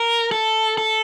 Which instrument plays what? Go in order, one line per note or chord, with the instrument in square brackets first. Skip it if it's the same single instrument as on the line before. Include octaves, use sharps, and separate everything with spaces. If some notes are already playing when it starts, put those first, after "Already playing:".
Already playing: [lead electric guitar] A#4
A4
A4